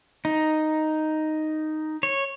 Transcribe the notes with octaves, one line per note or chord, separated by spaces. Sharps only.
D#4
C#5